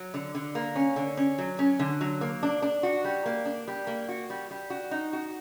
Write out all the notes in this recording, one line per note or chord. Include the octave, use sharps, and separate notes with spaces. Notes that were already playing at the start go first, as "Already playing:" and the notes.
Already playing: F#3
D3
D3
A#3
C#4
D3
C#4
F#3
C#4
D3
F#3
A#3
D4
D4
F#4
G3
A#3
D4
G3
A#3
F#4
G3
G3
F#4
D#4
F#4